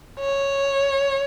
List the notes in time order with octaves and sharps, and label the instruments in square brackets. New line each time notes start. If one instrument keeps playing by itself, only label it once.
[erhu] C#5